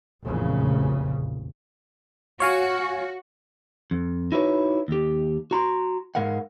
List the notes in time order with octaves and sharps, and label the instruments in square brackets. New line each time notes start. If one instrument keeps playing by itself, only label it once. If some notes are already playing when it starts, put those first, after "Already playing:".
[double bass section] F1 A#1 E2 A#2 C#3
[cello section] F#4 [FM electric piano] C#5 F5 G#5
[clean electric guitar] F2
D#4 E4 F#4 A#4 B4 C#5
D#2 G4
F#4 A#5 C6
G#2 C#3 G#3 A#4 F5 F#5